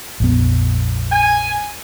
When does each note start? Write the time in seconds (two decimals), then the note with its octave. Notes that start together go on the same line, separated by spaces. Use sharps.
0.20 A#1 F2 B3
1.11 G#5